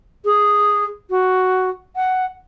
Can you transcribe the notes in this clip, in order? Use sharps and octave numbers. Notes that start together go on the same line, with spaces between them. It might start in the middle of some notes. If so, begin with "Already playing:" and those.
G#4
F#4
F#5